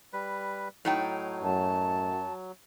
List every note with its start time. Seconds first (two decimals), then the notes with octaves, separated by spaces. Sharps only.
0.13 G3 B4
0.85 A2 F#3 D#4 G5
1.44 F#2 A5